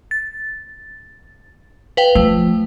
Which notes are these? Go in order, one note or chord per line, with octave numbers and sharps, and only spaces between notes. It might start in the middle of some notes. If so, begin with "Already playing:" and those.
A6
B4 F5 G5
F3 A3